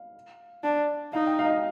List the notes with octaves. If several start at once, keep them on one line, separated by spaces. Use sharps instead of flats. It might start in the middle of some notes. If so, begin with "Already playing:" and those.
Already playing: F5
D4
D#4 F5
G5
F5
D#5
F5